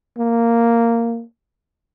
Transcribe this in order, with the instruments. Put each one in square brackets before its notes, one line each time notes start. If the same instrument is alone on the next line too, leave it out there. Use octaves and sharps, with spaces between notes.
[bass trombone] A#3